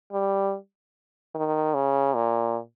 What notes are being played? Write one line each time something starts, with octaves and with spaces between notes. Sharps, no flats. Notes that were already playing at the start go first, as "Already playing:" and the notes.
G3
D#3
C#3
A#2